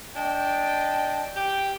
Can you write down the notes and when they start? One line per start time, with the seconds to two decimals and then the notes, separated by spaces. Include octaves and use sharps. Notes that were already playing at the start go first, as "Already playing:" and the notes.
0.16 D4 D#5 G5
1.37 G4 G5